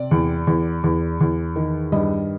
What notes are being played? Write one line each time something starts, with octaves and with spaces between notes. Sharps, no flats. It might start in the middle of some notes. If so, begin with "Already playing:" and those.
Already playing: C3 D5
E2
E2
E2
E2
D#3
G2 D#5